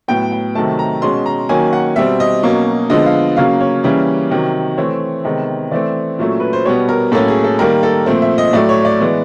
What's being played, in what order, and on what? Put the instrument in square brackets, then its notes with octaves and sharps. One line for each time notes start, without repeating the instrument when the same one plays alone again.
[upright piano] A2 F#3 B3 G5
G5
C3 D#3 F#3 A3 A5
A#5
B2 G#3 C#4 C6
A#5
D#3 F#3 A#3 C#4 G#5
F#5
B2 G3 C4 E5
D#5
B2 F#3 A#3 C#4
D3 F3 G#3 B3 D#5
F5
C#3 F#3 A#3 C#4 F5
C#5
C#3 E3 G3 A#3 C#4
C3 D#3 F#3
E3 A3 C4 C#5
C3 D#3 G#3 B3
E3 A3 C4 D5
A#2 F#3 A3 C#4
B4
C5
B2 G3 B3 C#5
A#4
A2 F#3 A#3 C#4 A4
G#4
A4
D#3 G3 A#3 A#4
A4
A#2 F3 A3 C4
E5
D#5
A2 F#3 A3 D5
C#5
D5
E3 G#3 B3